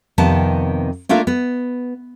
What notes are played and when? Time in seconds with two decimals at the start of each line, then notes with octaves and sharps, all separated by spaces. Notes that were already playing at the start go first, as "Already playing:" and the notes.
0.18 F2 C3 D#3 B3 A5
1.09 A3 A#3 D4 F4 E5
1.27 B3